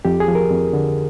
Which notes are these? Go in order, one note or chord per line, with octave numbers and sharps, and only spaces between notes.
F2 G4
G#4
F3
A#4
F2
D3